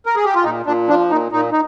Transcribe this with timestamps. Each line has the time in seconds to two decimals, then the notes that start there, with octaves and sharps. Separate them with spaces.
0.06 A#4
0.15 G#4
0.25 G4
0.35 F4
0.44 A#2 D#4
0.66 A#2 D4
0.88 F3 D4
1.10 A#2 D#4
1.32 A#2 D#4
1.52 D#4